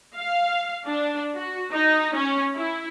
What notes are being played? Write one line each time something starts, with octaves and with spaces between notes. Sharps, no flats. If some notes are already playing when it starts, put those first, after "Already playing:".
F5
D4
F#4
D#4
C#4
E4